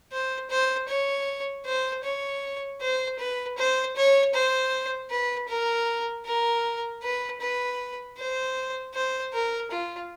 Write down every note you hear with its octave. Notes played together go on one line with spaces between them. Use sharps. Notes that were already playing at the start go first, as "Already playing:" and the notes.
C5
C5
C#5
C5
C#5
C5
B4
C5
C#5
C5
B4
A#4
A#4
B4
B4
C5
C5
A#4
F4